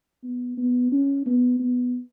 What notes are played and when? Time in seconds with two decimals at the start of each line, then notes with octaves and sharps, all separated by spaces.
0.23 B3
0.57 B3
0.92 C#4
1.26 B3
1.59 B3